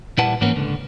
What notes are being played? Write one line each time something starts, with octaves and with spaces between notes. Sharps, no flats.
A#2 G3 E4 B4 F#5 A5
G#2 E3 A#3 B3 C#4
C#2 D3